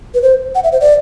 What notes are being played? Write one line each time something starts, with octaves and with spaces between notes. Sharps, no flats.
B4
C5
F#5
E5
C5
D5